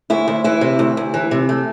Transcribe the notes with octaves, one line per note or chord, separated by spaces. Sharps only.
D2 E4
D2
E3 E4
C3
D2
D2
E3
C3
A3